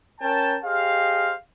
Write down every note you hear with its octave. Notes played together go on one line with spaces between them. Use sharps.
C#4 A#4 G5 A5
G4 G#4 C5 D#5 F5